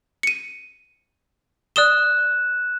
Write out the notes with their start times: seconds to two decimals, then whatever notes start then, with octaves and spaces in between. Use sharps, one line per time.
0.23 C#7 D#7
1.76 D5 D#6 F#6 E7 G7